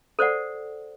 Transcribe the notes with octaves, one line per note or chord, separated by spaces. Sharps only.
A4 C5 D5 F#5